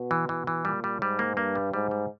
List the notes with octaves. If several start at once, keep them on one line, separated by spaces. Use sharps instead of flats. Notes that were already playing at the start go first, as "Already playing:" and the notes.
Already playing: B2
E3
B2 E3
E3
A#2 G3
G3
G#2 G3
A#3
G2 A#3
G3
G#2 G3
G3